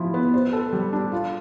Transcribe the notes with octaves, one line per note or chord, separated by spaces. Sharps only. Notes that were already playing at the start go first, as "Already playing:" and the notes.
Already playing: F3 E4
B3
C5
A4
G3
D4
F4